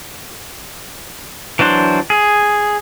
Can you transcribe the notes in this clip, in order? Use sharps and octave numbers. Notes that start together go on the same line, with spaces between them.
E3 F#3 D4 C5
G#4